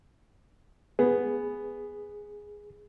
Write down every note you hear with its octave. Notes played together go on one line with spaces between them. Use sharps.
B3 G#4